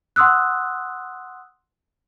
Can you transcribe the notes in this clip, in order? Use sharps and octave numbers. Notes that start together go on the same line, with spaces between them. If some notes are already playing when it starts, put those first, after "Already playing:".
F#5 C6 D#6 E6 F#6